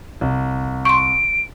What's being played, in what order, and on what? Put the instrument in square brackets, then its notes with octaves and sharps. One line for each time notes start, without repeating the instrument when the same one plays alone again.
[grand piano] C2
[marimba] C6 C#6 [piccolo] D7